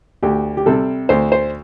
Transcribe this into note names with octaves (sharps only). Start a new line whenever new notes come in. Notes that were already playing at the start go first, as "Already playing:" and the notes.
D2 G4
G4
C3 G3 A4
D2 C5
C5